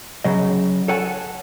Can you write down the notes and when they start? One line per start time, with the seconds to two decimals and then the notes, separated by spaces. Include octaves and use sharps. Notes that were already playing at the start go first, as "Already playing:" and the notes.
0.24 C#3 F#3 D#5
0.88 A4 C#5 F#5 G#5 A5